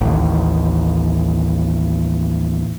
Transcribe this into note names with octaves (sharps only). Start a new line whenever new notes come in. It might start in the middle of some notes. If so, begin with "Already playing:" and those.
A1 D#2